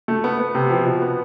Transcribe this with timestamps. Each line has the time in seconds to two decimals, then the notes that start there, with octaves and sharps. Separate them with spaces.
0.08 A3
0.24 B3
0.39 B3
0.55 C3
0.70 F3
0.86 B2
1.02 B3